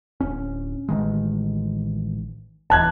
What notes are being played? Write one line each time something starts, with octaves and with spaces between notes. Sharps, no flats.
D1 C#4
A1 D#3 G#3
D#1 E2 A5 F#6 G#6